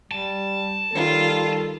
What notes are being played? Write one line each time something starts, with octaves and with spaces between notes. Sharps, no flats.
G3 A5
D#3 G3 F4 A4